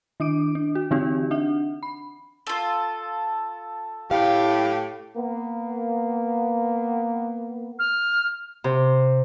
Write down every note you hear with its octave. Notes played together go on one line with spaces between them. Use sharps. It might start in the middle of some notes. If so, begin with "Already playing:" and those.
D#3 D4 D6 D7
D4
F#4
D3 E3 C4 D#4 F#4 G4
D4 E5 F#5
B5
F4 A4
A2 G4 F5
A#3 B3
F6
C3